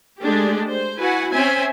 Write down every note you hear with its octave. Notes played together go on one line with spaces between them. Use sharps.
G#3 A3 D4 G4
C5
E4 F#4 B4 F#5 G#5
C4 C#4 C5 E5 G#5